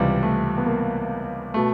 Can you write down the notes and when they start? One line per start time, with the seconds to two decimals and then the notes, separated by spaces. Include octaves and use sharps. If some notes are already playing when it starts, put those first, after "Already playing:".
Already playing: C#2 C3 E3 G3
0.23 A3
0.58 B3
0.66 A#3
1.54 B2 A3